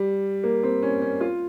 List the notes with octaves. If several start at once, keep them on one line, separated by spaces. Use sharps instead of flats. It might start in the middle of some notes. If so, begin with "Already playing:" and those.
Already playing: G3
A#3
C4
C#4
C#4
F4